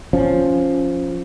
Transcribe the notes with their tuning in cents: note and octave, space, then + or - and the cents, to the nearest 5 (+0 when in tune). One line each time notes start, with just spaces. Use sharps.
F3 +0 C#4 +0